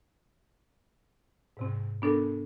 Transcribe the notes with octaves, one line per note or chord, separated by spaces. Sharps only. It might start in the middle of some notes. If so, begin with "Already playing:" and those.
G#2 C3 C4
B3 D4 A4 A#4